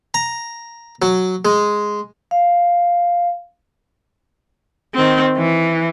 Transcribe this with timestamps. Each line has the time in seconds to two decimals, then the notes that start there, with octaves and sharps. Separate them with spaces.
0.14 A#5
1.02 F#3
1.45 G#3
2.31 F5
4.95 D#3 C4
5.37 E3